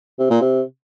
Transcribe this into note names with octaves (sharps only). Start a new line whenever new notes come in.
C3
A#2
C3